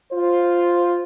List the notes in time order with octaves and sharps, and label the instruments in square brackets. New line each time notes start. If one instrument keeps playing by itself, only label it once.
[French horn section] F4 C5